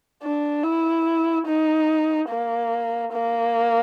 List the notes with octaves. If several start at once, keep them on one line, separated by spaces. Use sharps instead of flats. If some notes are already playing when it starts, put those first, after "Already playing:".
D4
E4
D#4
A#3
A#3